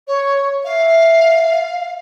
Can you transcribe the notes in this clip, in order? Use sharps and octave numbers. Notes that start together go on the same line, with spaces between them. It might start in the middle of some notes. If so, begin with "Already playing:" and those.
C#5
E5 F5